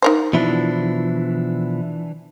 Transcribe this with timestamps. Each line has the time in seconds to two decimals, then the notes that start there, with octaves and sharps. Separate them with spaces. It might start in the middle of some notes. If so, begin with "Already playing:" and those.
0.02 D#4 A#4 C5
0.33 B2 E3 F3 D4 E4